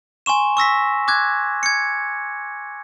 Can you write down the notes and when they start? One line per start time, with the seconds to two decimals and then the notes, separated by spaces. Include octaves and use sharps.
0.26 G#5 C6 C#6 E7
0.57 C#6 E6 A#6 B6
1.08 D6 F#6 G#6
1.63 G#6 C#7